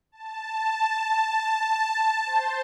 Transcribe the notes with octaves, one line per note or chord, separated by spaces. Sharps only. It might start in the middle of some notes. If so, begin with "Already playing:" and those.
A5
C5